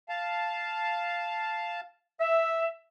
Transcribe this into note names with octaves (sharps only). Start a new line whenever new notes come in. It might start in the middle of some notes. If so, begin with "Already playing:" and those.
F5 A5
E5